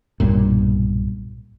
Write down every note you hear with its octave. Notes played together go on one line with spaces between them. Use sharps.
B1 G2 A#2